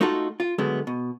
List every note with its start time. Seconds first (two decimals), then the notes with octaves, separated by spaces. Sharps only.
0.01 A3 D#4 F4 F#4 A4
0.40 F4
0.58 D3 F#3 G#3 A3 B3
0.87 B2